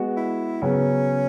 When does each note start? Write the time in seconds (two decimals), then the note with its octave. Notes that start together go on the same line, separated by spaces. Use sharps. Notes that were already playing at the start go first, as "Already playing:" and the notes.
Already playing: G#3 B3 F#4
0.17 E4
0.62 C#3 F#3 B3 C#4